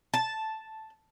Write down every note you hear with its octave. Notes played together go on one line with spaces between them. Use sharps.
A5